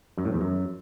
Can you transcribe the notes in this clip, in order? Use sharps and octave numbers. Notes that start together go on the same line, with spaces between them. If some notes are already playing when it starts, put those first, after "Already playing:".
F#2
A2
E2
F#2